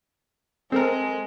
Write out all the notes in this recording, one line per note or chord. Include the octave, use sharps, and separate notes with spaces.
G#3 C4 A4 A#4